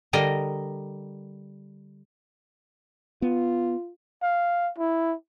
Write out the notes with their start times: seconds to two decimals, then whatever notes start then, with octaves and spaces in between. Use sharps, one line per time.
0.13 D3 G3 A#4 D#5
3.22 B3 F4
4.22 F5
4.78 E4